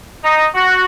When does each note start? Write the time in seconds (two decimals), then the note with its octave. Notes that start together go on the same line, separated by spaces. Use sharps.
0.24 D#4
0.55 F#4